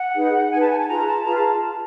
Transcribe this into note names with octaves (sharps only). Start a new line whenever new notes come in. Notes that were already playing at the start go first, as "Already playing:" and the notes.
Already playing: F#5
D#4 G#4 B4
D#4 G#4 B4 G#5
A5
G#5
A5
F4 G#4 B4 A#5
A5
F4 G#4 B4 A#5
A5